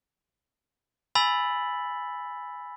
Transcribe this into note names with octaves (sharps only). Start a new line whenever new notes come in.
G#5 B5 E6 A6 B6 F#7